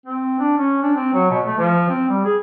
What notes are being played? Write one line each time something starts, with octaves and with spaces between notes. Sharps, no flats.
C4
D4
C#4
D4
C4
F#3
B2
A3
F3
C4
G3
G#4